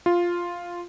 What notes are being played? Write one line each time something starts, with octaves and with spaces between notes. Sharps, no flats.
F4